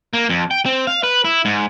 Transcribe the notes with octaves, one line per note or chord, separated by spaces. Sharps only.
A#3
F2
G5
C4
F5
B4
E4
G#2